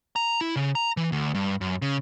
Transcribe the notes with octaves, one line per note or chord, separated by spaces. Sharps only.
A#5
E4
C#3
A#5
E3
D2
G2
F#2
C#3